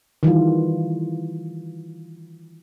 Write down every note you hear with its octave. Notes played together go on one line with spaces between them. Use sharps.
D#3 E3 G3 F4